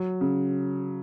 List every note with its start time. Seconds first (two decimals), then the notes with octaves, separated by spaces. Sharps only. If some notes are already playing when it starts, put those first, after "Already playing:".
Already playing: F#3
0.21 C#3